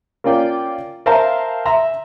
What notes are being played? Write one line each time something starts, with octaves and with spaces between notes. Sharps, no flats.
A#3 C#4 F4 D5 G5
A#4 C5 E5 F5 A5 A#5
E5 A#5 C6